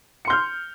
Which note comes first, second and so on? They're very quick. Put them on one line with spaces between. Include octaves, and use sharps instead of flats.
C#7 C6 G6 F6